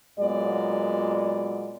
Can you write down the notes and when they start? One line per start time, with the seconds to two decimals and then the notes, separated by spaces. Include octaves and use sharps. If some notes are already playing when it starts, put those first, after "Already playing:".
0.19 A#2 F#3 G#3 B3 D5